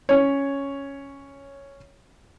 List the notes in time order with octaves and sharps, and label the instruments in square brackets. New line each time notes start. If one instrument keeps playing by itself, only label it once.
[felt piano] C#4 C#5